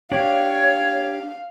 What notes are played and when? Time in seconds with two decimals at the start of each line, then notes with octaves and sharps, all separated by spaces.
0.12 D4 G4 C#5 D5 F5